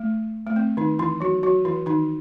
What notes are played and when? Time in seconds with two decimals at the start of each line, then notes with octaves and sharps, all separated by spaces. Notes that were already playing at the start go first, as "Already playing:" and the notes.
Already playing: A3
0.47 A3
0.56 C4
0.77 D#3 D#4
0.99 E3 E4
1.20 F#3 F#4
1.43 F#3 F#4
1.65 E3 E4
1.86 D#3 D#4